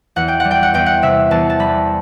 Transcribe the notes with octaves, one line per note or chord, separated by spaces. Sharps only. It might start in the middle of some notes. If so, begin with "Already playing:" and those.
E2 F#5
G5
F#5
G3
G5
F#5
E2 G5
F#5
C3 E5
E2 A5
A5
G3 B5